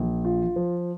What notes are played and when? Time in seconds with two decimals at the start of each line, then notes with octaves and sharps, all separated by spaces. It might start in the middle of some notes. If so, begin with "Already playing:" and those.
Already playing: A#1
0.25 F4
0.56 F3